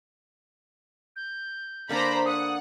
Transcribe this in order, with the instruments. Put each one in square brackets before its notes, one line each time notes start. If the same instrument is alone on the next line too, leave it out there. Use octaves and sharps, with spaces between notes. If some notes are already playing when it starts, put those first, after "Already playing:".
[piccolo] G6
[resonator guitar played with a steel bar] D3 A#3 D4 [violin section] C5 A#5 B5
[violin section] F#5 [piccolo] D#6